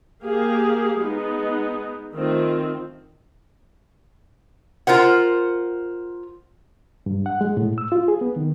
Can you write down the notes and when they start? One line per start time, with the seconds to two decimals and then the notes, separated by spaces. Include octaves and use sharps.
0.24 A#3 G4 G#4 F5
1.01 G#3 B3 D#4
2.14 D#3 A3 C4 F4
4.87 F4 A#4 C5 F#5
7.06 G2
7.26 F#5
7.41 G#3
7.57 A2
7.78 E6
7.92 F4
8.08 G#4
8.21 B3
8.36 D#3